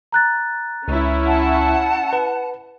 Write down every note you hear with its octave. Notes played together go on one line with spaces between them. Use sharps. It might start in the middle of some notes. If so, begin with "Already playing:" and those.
A#5 F#6 A6
C#2 C#4 E4
F#5 A5
B4